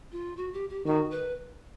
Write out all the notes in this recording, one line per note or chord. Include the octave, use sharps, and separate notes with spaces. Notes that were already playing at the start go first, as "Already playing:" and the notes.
F4
F#4
G4
G4
D#3 F#4
B4